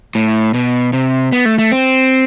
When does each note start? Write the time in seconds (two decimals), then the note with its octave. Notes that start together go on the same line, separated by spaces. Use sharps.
0.15 A2
0.54 B2
0.93 C3
1.32 B3
1.45 A3
1.58 A3
1.72 C4